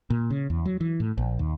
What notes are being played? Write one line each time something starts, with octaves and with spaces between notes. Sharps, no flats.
A#2
C#3
E2
F#3
E3
A2
A#1
D#2